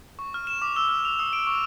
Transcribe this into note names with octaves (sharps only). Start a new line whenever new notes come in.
C#6
F6
E7
D6
E6
F6
F7
D#6
D7
C#6